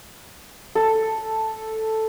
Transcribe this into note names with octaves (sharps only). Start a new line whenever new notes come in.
A4